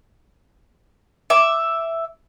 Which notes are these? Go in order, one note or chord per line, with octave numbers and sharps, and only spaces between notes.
E5 D6